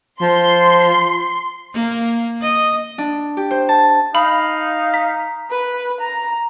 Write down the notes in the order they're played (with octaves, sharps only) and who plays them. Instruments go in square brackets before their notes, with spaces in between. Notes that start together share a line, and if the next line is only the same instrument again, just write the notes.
[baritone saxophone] F3 [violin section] C6
[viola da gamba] A#3
D#5
[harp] D4
G4
C5
A5
[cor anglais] D#4 [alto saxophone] F5 [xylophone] B5
[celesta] A#5 D#6 [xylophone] B6
[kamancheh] B4
A#5